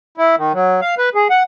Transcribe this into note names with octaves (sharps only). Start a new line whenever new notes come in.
E4
D#3
F#3
F5
B4
G#4
F#5